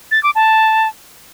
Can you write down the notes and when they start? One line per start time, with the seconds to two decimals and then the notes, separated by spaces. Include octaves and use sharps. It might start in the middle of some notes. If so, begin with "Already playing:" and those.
0.11 A6
0.23 D6
0.35 A5